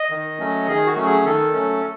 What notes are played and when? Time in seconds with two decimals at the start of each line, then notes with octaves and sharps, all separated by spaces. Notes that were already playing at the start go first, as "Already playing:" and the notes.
Already playing: D#5
0.10 D#3
0.39 F#3 A3 C#4
0.67 D#3 G#4
0.87 F#4
0.96 F#3 A3 C#4
1.05 G#4
1.25 D#3 A4
1.53 F#3 A3 C#4